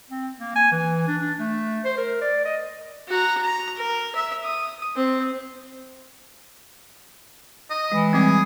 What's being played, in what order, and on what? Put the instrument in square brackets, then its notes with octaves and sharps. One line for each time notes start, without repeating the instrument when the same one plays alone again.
[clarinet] C4
A#3
G#5
E3
D4
D4
A3
C5
A#4
D5
D#5
[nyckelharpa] F#4 A#5
A#5
A#4
E5
D#6
C4
[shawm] D#5
[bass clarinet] E3 [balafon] G#3
[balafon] G3 C4 [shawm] G#4